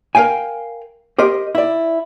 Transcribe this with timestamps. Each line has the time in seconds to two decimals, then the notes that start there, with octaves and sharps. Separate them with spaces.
0.15 A#4 C5 F5 G5 G#5
1.18 G4 A#4 C5 D#5
1.55 E4 D5